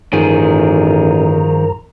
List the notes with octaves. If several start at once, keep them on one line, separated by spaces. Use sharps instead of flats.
A1 G2 D#3 F3 G#4 A#4 A#5